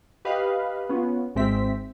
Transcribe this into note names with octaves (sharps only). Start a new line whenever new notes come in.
G4 B4 D#5 F5
B3 C#4 F4
G#1 G#3 C4 E5 B6